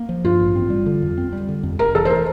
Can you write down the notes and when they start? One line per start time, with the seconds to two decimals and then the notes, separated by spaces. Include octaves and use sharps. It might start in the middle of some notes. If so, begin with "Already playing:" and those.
Already playing: A#3
0.09 F3
0.24 G2 F4
0.40 A1
0.56 C4
0.70 G3
0.86 D3
1.02 F2
1.18 C4
1.33 G3
1.49 D3
1.63 F2
1.79 F1 A#4
1.95 E3 A4
2.05 C5
2.10 A#4